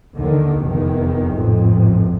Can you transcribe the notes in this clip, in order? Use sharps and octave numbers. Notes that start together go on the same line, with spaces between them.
D#2 D3 D#3
F1 E2 D#3
A1 F2 G#2